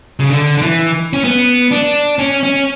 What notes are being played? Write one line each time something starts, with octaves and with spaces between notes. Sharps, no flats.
C#3
D3
D3
E3
C#4
B3
D4
C#4
C#4